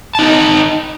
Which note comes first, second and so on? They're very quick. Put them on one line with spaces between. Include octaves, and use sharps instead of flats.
A5 D#4 D#5 G5